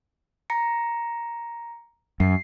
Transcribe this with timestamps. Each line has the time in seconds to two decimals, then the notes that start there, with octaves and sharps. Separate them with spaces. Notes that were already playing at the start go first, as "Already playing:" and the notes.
0.50 A#5 A#6 C#7
2.20 F#2 C7